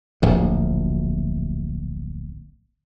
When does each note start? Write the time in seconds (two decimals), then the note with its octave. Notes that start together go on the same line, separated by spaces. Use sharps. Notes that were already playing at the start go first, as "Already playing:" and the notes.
0.22 D1 A#1 A2